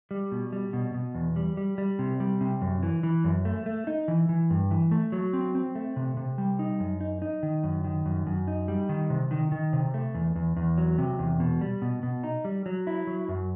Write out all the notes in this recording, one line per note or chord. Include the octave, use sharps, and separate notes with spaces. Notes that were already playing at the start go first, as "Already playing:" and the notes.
G3
B2
G3
B2
B2
E2
G3
G3
G3
C3
G3
C3
F#2
E3
E3
F#2
A3
A3
D#4
E3
E3
G2
E3
A3
F#3
C4
C4
A3
C3
C3
G3
D#4
F#2
D#4
D#4
D#3
F#2
D#3
F#2
F#2
D#4
G3
D#3
C3
D#3
D#3
C3
A3
E2
E2
E2
F#3
C3
E2
B2
G3
B2
B2
D#4
G3
F#3
E4
F#3
F#2